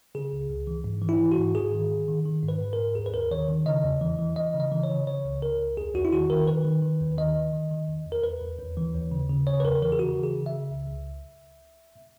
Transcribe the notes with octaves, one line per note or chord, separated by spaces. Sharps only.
C#3 G#4
C#2
C#2
E3
G#2
E3
E4
E3
F#4
G#2
G#2 G#4
D#3
D#3
D#3
D#3
G#2
B4
G#2
A#4
G#2
D#2 G#4
B4
D#2 A#4
D#3 C#5
D#3
C#3 D#5
E2
E3
E3
E3 D#5
C#3
D#5
E3
C#5
C#3
C#3 C#5
C#2
C#2 A#4
C#2
E2 G#4
E2 F#4
E4
D#3 F#4
D#3 A#4
D#3 B4
D#3
D#3
D#2
D#3 D#5
D#3
D#3
D#3
E2
E2
A#4
E2 B4
E2
D#2
E3
D#2
C#3
C#3
C#3 C#5
B4
E2 A#4
E3 A#4
G#4
C#3 F#4
E3
G#4
C#3
E5
C#3
C#2
C#2